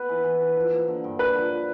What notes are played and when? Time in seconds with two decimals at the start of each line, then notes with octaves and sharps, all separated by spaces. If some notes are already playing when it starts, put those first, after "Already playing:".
Already playing: B3 B4
0.09 E3
0.24 E3
0.41 E3
0.56 F3
0.72 A#3
0.88 D3
1.04 G2
1.19 D3 B4
1.36 F3